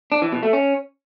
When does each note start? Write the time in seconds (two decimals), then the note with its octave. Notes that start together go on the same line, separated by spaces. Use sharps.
0.12 D4
0.22 E3
0.32 B2
0.43 A3
0.53 C#4